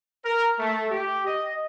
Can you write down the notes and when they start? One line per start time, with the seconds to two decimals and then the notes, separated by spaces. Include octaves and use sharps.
0.25 A#4
0.59 A3
0.90 G4
1.26 D#5